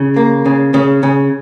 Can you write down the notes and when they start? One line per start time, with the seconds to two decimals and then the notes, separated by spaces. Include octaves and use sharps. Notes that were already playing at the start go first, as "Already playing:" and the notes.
Already playing: C#3
0.16 A#3
0.46 C#3
0.74 C#3
1.03 C#3